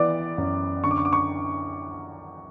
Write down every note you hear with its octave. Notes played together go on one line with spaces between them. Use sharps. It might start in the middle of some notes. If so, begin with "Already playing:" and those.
Already playing: E3 B3 D5 D6
F#2
D3 C#6
D6
C#6
D6
C#6